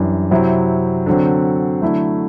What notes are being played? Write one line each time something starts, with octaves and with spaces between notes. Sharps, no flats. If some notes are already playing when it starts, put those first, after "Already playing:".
Already playing: F#2 E3 G3 D4
C3 F#3 C4 E4
D3 F#3 C4
D3 F#3 A3 E4